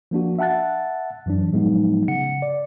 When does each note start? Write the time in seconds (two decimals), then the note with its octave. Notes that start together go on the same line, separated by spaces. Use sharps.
0.11 F3 A#3 D4 F#4
0.39 E5 F#5 A5 F#6 A6
1.26 F#2 E3 F#3 D4
1.51 A2 F3 F#3 G#3 B3 D#4
2.08 C#3 F#5 C#7
2.42 D5